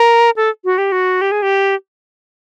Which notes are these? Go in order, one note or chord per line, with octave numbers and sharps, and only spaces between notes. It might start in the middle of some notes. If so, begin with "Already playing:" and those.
Already playing: A#4
A4
F#4
G4
F#4
G4
G#4
G4